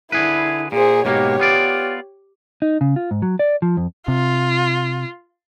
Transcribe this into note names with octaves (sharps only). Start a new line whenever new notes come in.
D3 E4 G#4 B4
A#2 G#4 C5
G#2 B2 A#3 G4 C#5
B3 F4 D5
D#4
C#3
F4
G#2
F#3
D5
F3
F2
C3 F4